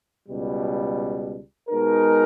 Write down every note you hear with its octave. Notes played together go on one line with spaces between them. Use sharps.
C#2 B2 G3
B2 G#3 D#4 A#4